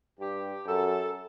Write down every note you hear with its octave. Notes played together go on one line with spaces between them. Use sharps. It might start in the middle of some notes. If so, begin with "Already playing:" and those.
G2 G4
F#2 A4